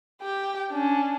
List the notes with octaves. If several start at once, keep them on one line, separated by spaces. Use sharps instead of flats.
G4 G5
C#4 D4